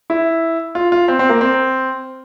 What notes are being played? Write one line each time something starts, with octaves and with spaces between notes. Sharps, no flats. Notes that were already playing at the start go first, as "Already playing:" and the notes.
E4
F4
F4
C4
C4
A#3
C4